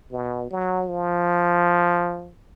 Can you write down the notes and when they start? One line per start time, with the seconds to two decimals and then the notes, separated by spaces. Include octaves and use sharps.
0.11 B2
0.50 F#3
0.89 F3